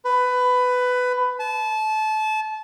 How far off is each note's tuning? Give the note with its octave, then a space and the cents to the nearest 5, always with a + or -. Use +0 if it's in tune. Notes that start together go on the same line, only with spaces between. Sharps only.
B4 +15
A5 -25